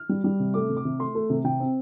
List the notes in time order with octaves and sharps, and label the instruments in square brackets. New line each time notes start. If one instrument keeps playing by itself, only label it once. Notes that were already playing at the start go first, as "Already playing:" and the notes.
Already playing: [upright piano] F6
G3
G3
C3
A3 D6
C3
D6
C3
A3 C6
A3
C3
C3 G5
C4